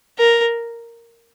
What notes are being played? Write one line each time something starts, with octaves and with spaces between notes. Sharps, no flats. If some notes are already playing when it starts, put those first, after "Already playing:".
A#4